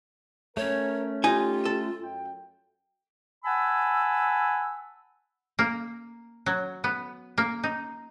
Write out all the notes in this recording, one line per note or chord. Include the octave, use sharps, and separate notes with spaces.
A3 C#4 A#4 C#5
D#4 F4 G4 G#5
A4
F#2 G5
F#5 G#5 A5 B5 E6
A#3
F#3
B3
A#3
D#4